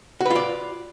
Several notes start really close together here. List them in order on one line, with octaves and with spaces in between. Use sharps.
F#4 B4 F4 D5